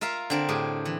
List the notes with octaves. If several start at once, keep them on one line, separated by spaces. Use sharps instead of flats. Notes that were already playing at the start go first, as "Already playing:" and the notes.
F4 A#4 E5 F5 A#5
D3 C4 A#4
A2 G4 G#4
E3